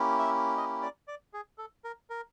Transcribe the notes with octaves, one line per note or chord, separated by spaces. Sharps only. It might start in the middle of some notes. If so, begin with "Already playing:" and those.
Already playing: A#3 C#4 E4 G4
E5
D#5
D5
D5
G#4
A4
A#4
A#4